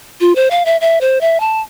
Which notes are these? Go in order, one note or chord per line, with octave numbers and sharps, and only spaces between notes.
F4
C5
F5
E5
E5
C5
E5
A5